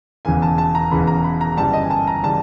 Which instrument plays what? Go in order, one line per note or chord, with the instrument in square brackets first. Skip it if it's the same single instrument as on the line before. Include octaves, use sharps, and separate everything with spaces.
[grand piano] E1 E2 C#3 E3 G#5
A5
A5
A#5
E1 E2 C#3 E3 B5
A#5
B5
A#5
G1 F#2 C#3 E3 G3 A5
D#5
G#5
A5
A#5
C#3 E3 G3 A5